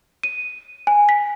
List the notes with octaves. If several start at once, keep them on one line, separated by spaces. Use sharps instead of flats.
D#7
G#5
B6